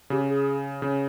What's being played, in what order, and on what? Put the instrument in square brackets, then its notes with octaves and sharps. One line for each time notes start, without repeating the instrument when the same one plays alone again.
[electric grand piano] C#3 [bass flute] G4
[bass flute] G#4
[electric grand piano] C#3